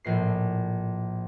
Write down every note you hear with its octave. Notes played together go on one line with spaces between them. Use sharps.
A#1 A2 C7